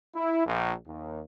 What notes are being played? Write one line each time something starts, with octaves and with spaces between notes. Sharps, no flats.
E4
A#1
D#2